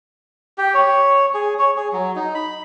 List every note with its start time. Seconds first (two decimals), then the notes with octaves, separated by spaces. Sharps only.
0.58 G4
0.74 C#5
1.34 G#4
1.59 C#5
1.77 G#4
1.93 F#3
2.16 D#4
2.35 B5